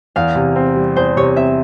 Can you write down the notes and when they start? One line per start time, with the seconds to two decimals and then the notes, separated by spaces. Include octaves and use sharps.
0.16 E2 F5
0.36 C3
0.56 C4
0.76 G3
0.96 E2 C5
1.17 C3 C#5
1.36 C4 E5